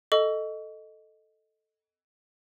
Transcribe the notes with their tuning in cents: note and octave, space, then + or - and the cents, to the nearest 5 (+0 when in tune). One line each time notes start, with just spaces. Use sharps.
A4 +0 D#5 +0 C#6 +35